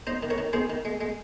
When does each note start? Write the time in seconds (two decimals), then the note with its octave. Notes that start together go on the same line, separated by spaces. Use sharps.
0.07 D#4 C5 D#5
0.23 D#3
0.30 A#4 C#5
0.38 D#3
0.53 D#3 G#4 C5
0.70 D#3
0.85 G#3
1.01 G#3